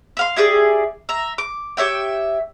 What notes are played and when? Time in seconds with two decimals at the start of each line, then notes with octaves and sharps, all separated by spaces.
0.17 E5 F5 C6
0.36 E4 G4 G#4 D5
1.09 E5 A#5
1.38 D6
1.77 G4 C#5 E5 G5